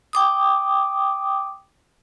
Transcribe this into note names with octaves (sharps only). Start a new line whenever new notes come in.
G5 D6 D#6